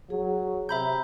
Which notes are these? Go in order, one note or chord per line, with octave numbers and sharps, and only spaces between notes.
F#3 G#4
C3 E5 A#5 B5 G6